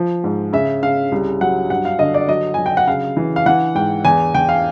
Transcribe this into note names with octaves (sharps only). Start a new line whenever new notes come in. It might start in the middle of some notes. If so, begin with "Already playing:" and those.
Already playing: F3
G#2
C#3 E5
C#3 F5
C2
F#3 F#5
G2 F#5
F5
D3 D#5
D5
F#3 D#5
F#3 G#5
G5
F#5
C#3 F5
E3
F5
E3 F#5
G#2 G5
E2 G#5
E2 G5
F5